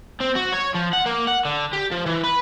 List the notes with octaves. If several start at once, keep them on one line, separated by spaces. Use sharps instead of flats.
C4
F#4
C#5
F3
F#5
A#3
F#5
D3
G4
F3
E3
B4